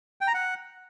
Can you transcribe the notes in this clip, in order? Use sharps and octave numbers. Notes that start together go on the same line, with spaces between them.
G5
A#5
F#5